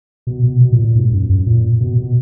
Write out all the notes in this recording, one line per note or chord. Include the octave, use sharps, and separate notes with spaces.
B2
B2
B2
A#2
A#2
G#2
F#2
F#2
A#2
B2
B2